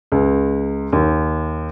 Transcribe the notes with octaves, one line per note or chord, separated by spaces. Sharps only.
C#2
D#2